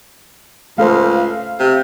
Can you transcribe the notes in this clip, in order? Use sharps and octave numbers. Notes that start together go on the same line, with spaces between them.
C#2 A3 A4 C5 F5
C3